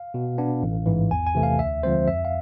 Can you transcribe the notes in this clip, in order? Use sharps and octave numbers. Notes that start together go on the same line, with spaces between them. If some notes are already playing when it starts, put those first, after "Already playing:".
Already playing: F5
B2
B3 D4
A1
G#2 E3
E2 G#5
G#5
C3 E3 A3
F5
D2 E5
D3 F3 G#3 C4 C5
F2 E5
F5